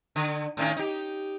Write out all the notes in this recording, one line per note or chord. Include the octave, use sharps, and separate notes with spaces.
D3
A2 D#3 C#4
D#4 G4